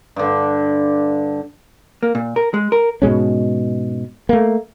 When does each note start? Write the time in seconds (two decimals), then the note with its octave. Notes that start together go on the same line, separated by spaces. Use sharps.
0.16 G2 D3
2.03 A#3
2.15 A#2
2.36 A#4
2.54 G#3
2.72 A#4
3.02 G#2 B2 G#3 C#4
4.29 A3 A#3